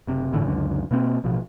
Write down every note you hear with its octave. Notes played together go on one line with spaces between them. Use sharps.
F#1 C3
G1 A2 D3 E3
C#2 F#2 D3
B2 A#3 C4
A1 B2 F3